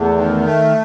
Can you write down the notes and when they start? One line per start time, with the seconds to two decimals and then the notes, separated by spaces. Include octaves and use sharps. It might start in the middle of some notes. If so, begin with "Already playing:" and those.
Already playing: E2 A3
0.15 D#3
0.45 A3